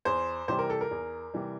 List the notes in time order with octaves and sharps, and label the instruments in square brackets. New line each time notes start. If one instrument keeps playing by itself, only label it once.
[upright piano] E2 C5
C3 E3 G3 C5
A#4
A4
A#4
E2
C3 E3 G3